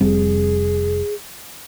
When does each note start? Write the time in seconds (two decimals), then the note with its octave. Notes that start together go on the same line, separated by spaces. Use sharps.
0.01 F1 G3 C4 G#4